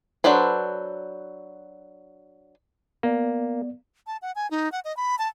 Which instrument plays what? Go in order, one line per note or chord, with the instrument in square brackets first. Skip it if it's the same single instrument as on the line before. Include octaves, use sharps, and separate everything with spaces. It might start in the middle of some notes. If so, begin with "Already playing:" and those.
[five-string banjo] F#3 D4 A4 B4 C5
[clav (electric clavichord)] A#3 [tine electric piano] B3 D5
[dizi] A5
F#5
G#5
D#4
F#5
D#5
B5
A5